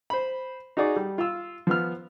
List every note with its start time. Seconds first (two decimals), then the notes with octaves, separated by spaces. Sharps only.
0.10 C5 B5
0.77 D#4 F#4 G#4 D5
0.96 G3
1.18 F4 F5 E6
1.67 F3 B3 F6